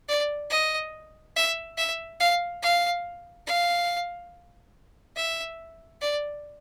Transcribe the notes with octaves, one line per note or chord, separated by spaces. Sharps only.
D5
D#5
E5
E5
F5
F5
F5
E5
D5